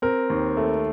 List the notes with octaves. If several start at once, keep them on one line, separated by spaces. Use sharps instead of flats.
C4 A#4
D#2
A3